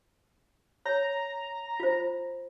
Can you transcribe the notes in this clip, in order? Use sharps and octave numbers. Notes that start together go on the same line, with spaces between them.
C#5 A#5
F4 C5